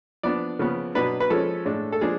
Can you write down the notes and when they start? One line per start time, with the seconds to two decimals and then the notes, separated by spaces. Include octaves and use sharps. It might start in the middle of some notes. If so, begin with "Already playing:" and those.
0.23 F3 B3 D4 D5
0.59 C#3 F3 B3
0.95 B2 F#3 B3 D4 B4
1.20 B4
1.30 F3 G#3 C#4 A4
1.65 A2 G#3 D4
1.92 A4
2.01 F3 G#3 D4 G#4